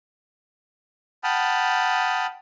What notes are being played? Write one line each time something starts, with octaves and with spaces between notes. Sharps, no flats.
F#5 G5 A5 B5 D#6 F6